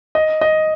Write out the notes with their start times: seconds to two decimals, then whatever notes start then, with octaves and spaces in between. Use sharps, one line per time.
0.15 D#5
0.41 D#5